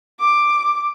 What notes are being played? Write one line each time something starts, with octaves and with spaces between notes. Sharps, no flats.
D6